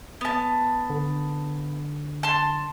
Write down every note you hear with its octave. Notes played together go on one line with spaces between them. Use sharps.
B3 A5
D3
A5 C6